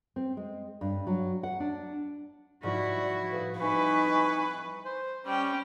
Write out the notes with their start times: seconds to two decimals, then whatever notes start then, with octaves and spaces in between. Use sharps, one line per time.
0.16 C4
0.37 G#3
0.81 G2
1.07 F#3
1.43 F#5
1.60 D4
2.63 G#2 F3 G3 E4 F#4 D5 C#6
3.31 A2 G#4 B4 F5
3.59 G3 C4 D#4 E4 B4 F#5 G#5 C#6
4.85 C5
5.26 G3 C#4 G5